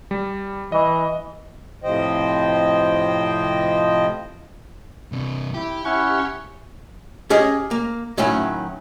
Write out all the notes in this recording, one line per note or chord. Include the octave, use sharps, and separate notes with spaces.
G3
E3 D#5
A2 C3 F3 C5 D#5 G5
G2 C3
E4 G4
C#4 E4 F#5 C#6
C#4 G4 G#4 C#5 D#5
A#3
A2 D#3 F#3 C#4 E4